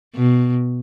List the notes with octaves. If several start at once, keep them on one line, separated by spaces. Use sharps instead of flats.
B2